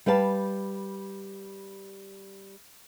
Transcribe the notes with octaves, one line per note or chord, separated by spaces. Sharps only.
G3 B4 F5 A5